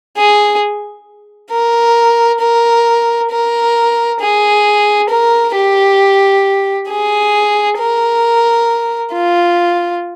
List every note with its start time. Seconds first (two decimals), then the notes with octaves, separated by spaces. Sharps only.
0.17 G#4
1.51 A#4
2.40 A#4
3.31 A#4
4.20 G#4
5.09 A#4
5.55 G4
6.89 G#4
7.79 A#4
9.13 F4